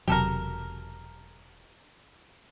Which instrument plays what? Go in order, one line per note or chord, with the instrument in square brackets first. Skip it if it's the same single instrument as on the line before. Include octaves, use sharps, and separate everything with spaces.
[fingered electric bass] E1 C3 F#3 [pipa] G4 A4 A#4